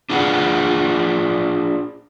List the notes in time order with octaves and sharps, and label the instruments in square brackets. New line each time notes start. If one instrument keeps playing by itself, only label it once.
[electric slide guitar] D4 F4 G#4 D5 F#5